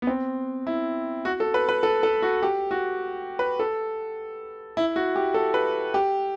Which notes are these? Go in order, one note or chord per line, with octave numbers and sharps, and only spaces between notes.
B3
C4
E4
F#4
A4
B4
B4
A4
A4
F#4
G4
F#4
B4
A4
E4
F#4
G4
A4
B4
G4